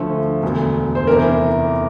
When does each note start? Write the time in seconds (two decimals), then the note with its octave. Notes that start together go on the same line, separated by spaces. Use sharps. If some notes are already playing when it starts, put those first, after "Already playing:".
Already playing: D2 D3 F3 A3 A4
0.43 E1 D2 D3
0.95 C5
1.07 F1 E2 E3 A#4